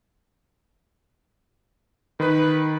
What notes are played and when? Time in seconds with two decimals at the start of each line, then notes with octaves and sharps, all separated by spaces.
2.20 D#3 B4